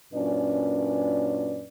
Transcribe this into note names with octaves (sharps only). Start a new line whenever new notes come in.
F#2 A#2 C#4 D4 B4 D5